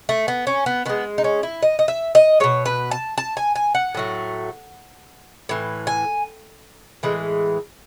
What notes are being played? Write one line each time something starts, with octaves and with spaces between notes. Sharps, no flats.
A3
B3
C#4
B3
D#3 G#3 B3
D#4
C#4
E4
D#5
D#5
E5
D#5
B2 G#3 C#5
B4
A5
A5
G#5
G#5
F#5
A2 F#3 A3
A2 E3
G#5
A2 E3 G#3